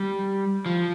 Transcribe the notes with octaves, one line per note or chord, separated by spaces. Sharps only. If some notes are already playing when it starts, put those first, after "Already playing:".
Already playing: G3
F3